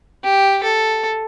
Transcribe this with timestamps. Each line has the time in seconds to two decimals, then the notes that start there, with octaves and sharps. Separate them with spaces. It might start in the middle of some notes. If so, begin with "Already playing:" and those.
0.24 G4
0.64 A4